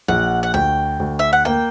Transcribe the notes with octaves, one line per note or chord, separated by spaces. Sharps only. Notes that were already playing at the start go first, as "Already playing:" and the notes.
A#1 F#5
F#5
D2 G5
D2
E5
F#5
A#3 G5